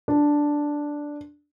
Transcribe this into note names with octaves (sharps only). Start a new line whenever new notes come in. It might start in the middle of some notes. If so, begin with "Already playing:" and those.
D4